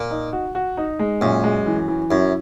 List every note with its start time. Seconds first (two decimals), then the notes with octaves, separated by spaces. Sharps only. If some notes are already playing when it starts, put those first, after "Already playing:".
Already playing: A#2
0.11 D#4
0.33 F#4
0.55 F#4
0.77 D#4
0.99 G#3
1.21 F#2 A#2
1.44 G#3
1.66 E3
1.88 E3
2.11 F#2 E4